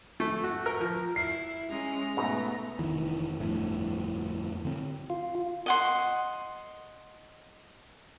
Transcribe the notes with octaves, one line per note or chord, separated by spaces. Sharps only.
A3
F#4
A#4
F3
E4 C7
G#3 C#4 A#5
G#2 B2 A3 B3
F1 C2 D#3 E3
G1 F2 A2
D3 C4
F4
D#5 F#5 C6